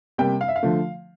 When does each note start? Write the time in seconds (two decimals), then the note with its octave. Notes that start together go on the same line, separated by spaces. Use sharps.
0.18 C3 G3 A#3 G5
0.41 F5
0.48 E5
0.56 F5
0.63 D3 F3 A3